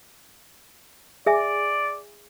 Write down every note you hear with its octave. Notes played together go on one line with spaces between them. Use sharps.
G#4 D5 E5 G#5